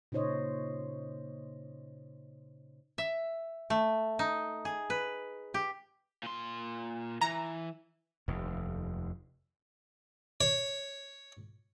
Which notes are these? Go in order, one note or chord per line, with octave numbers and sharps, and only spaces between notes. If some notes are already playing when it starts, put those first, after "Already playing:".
A#2 C#3 D#4 C5 C#5 D#5
E5
A3
D#4
G#4
B4
G4
A#2 C6
E3 A#5
F1 D#2
C#5